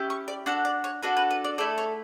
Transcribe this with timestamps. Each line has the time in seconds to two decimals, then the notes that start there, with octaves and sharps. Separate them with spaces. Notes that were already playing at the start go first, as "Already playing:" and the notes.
Already playing: C#4 E4 G4
0.10 C#6
0.28 D5
0.46 D4 F#4 A4 F#5
0.65 D5
0.84 C#5
1.03 D4 F#4 A4 B4
1.17 B4
1.31 B4
1.44 D5
1.58 A3 E4 A4 D5
1.78 C#5